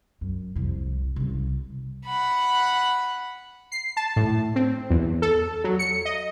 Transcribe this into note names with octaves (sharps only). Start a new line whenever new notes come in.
F#2
C2 F2
C2 C#3
F#5 B5
C7
A5
A2
C4
E2
A4
F#3
C#7
D#5